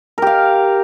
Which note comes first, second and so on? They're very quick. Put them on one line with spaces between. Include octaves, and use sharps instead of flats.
A#4 G4 F5